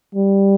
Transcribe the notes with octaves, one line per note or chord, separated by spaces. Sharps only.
G3